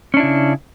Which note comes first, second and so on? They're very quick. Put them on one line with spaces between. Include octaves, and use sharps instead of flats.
C#4 D4 E4 C#3